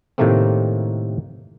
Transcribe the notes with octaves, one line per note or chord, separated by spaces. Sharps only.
A2 C3 D#3 A3 A#3 C4